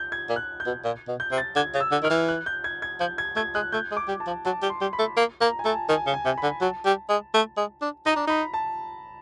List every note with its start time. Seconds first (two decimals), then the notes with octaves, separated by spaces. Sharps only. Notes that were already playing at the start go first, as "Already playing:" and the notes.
Already playing: G6
0.12 G#6
0.29 A#2
0.36 F#6
0.60 G6
0.66 B2
0.84 A#2
1.08 B2
1.20 G6
1.31 C3
1.38 A6
1.56 D3 G#6
1.74 C#3
1.80 E6
1.92 D3
2.03 D#3 F6
2.10 E3
2.29 F#6
2.46 G6
2.64 G#6
2.82 G#6
3.00 F3 G6
3.18 G#6
3.36 A3 G#6
3.55 G#3 F#6
3.72 A3 G6
3.91 G#3
3.97 D6
4.08 G3
4.20 A5
4.27 F3
4.45 F#3 A5
4.62 G3
4.69 C6
4.81 G3
4.93 B5
4.99 A3
5.17 A#3
5.41 A#3 A#5
5.59 G#5
5.65 A3 A5
5.89 D#3 G#5
6.07 C#3
6.14 G#5
6.25 C3
6.38 B5
6.43 D3
6.61 F#3 A5
6.85 G3
7.09 G#3
7.34 A3
7.57 G#3
7.82 D4
8.06 D#4 A#5
8.16 D4
8.27 D#4 B5
8.54 A5